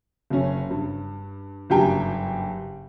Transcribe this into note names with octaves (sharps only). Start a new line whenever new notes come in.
F#1 C#4
G2
F#1 G2 G4 G5 G#5 A#5